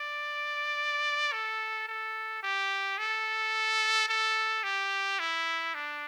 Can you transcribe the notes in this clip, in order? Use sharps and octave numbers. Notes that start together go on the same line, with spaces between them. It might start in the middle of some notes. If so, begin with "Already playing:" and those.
Already playing: D5
A4
A4
G4
A4
A4
G4
E4
D4